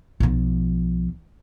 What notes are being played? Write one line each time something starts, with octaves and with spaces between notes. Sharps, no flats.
B1 F3